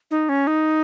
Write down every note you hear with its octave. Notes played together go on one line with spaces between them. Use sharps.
D#4
C#4
D#4